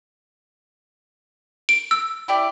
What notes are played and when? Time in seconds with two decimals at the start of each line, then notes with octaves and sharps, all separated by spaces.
1.69 D7
1.91 E6
2.28 E4 G4 D5